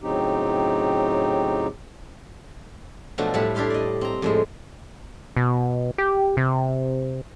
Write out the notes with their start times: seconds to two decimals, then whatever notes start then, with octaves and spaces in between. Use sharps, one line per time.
0.02 A2 C#3 F#3 C4 D#4 G4
3.18 B2 F3 F#3 A3 D4
3.34 A2 G3 E4 F#5 A5 B5
3.55 D4 E4 G4 F5 C6
3.70 D5 D#5
4.01 C4 A#5
4.22 F2 A2 G#3
5.36 B2
5.98 G4
6.37 C3